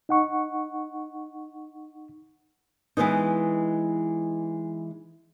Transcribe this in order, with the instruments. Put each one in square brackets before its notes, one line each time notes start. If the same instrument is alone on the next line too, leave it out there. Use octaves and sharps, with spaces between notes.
[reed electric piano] D#4 F#5 C#6
[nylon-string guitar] E3 G#3 B3 D#4